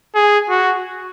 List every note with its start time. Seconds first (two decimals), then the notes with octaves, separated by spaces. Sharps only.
0.15 G#4
0.50 F#4